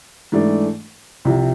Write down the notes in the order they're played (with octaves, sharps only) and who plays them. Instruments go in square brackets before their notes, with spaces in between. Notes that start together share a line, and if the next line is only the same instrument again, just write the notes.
[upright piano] G#2 E3 A3 D4
C2 C3 F3